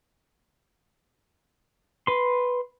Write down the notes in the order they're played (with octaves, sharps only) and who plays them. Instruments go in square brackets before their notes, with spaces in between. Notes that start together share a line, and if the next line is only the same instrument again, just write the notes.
[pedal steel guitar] B4 C6